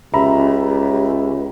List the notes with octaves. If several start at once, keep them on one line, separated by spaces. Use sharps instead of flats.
C#2 G4 E5 A#5 B5